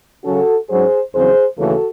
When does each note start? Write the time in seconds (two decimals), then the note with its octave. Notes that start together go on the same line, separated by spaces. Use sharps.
0.24 C#3 F#3 C#4 F#4 A4
0.69 G#2 F#3 C#4 G#4 C5
1.13 E2 C#3 F#3 C4 G#4 C5
1.58 D#2 C#3 E3 A3 C#4 F#4 A4